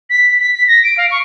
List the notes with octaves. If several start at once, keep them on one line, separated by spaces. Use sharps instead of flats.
B6
B6
B6
A#6
D7
F5
C#6